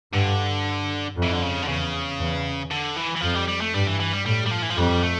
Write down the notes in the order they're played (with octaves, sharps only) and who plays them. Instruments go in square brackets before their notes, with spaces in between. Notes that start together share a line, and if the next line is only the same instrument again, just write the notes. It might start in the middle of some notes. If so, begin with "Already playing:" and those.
[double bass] G2 [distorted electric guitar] D3
[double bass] F2
[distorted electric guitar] E3
D3
C#3
D3
[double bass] E2 [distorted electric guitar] C#3
[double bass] E2
[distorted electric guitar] D3
E3
E3
[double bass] F2 [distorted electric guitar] F3
[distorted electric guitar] G3
G3
A3
[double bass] G2 [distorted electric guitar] G3
[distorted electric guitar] E3
E3
G3
[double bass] A2 [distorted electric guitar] G3
[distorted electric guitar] G3
F3
E3
F3
[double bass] F2 [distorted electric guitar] G3
[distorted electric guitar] A3